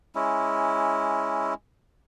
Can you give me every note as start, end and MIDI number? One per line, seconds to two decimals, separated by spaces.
0.15 1.54 56
0.15 1.54 61
0.15 1.54 64